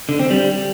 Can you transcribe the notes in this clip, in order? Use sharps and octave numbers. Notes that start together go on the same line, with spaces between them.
D3
C4
G3